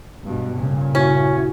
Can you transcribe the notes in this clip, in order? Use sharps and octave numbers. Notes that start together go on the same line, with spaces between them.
G2 B2
G2 A#2 C#3
C#4 E4 F#4